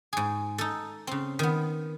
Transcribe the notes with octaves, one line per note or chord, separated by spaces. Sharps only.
G#2 G#4
D#4 A4
C#3 C4
D#3 B3